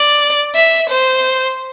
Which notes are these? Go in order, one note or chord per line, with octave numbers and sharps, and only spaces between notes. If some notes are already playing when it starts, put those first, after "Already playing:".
Already playing: D5
E5
C5